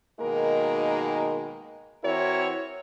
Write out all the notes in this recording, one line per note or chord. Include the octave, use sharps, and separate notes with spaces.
B2 D#3 G#3 A#3 D#4 A#4
E3 C4 E4 F#4 A#4 C#5